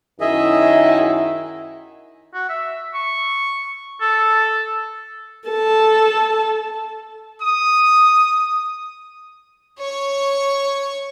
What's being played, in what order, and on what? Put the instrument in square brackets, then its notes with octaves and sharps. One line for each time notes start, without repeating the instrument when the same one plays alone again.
[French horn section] F#2 D#3 E4 [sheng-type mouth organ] G#4 D#5 E5
[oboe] F#4
E5
C#6
A4
[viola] A4 A5
[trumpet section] D#6
[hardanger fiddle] C#5 C#6